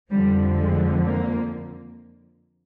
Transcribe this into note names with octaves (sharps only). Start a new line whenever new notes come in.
F2 D3 F3 G3
G#3
A#3